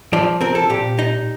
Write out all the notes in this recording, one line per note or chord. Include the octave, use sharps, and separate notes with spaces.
F3 D5
C4 A#4
A4
A#2 G4
D#4